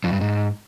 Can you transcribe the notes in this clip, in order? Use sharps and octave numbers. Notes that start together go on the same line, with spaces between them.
F2
G2
G#2